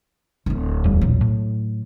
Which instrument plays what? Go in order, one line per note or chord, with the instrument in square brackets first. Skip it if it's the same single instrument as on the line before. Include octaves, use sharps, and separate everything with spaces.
[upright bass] D1 D#4
[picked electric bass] E2 G3
[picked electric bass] B1 E2 A#2 [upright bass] F#3
[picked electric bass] A2